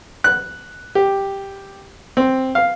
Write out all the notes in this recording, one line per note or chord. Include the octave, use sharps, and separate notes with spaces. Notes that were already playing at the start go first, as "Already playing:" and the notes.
F#6
G4
C4
F5